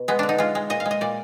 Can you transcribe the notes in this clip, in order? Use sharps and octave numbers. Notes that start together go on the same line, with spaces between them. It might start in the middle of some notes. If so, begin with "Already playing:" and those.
Already playing: B2
G#3 B3
D3 D4
D#4
G#3 F4
G#3
A#2 D#5
F5
G#3
D#5
A#2 D5